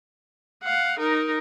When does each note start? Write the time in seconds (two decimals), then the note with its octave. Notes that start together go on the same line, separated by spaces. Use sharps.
0.63 F5 F#5
0.99 D#4 A#4